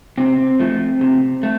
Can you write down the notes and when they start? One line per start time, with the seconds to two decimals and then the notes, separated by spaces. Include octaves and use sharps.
0.18 C3 C4
0.59 F3 A3
1.01 C3
1.43 A3